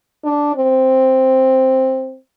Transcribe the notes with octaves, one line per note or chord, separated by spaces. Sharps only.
D4
C4